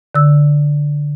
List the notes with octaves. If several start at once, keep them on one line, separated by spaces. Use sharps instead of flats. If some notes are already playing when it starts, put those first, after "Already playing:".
D3 E6